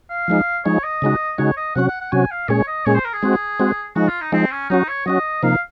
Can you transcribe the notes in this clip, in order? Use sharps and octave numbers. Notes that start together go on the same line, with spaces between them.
F5
F3 G#3 D#4
F3 G#3 D#4 C#5
D#5
C#3 G#3 D#4 F#4
C#3 G#3 D#4 F#4 C#5
D#5
C3 F#3 C#4 F#4 F#5
F#5
F#5
C3 F#3 C#4 F#4 G#5
F5
A#2 G#3 C#4 G#4 C#5
D#5
A#2 G#3 C#4 G#4 C#5
C5
A#4
G#4
G#3 C4 F#4
G#3 C4 F#4
F3 G#3 D#4 F#4
F4
D#4
F3 G#3 C4 D#4
C#4
F#3 C#4 D#4 F#4
C#5
F#3 C#4 F#4 D#5
C3 F3 A#3 D#4 F5